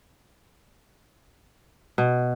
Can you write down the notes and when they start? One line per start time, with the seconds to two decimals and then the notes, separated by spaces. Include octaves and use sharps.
1.98 B2